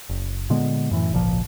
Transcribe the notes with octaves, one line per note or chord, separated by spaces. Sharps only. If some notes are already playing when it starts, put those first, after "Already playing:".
F#1
A#2 D3 G#3 B3
F#2 A2 E3
G#1 C#2 A#2 F3